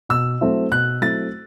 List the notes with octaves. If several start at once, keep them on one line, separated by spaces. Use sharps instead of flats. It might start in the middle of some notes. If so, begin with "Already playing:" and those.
B2 E6
F#3 A3 C4 E4
B2 F#6
F#3 A3 C4 E4 A6